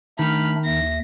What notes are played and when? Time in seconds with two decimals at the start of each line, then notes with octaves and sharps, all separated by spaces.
0.19 D#3 A3 D4 B5 F6
0.65 D#2 E5 A#6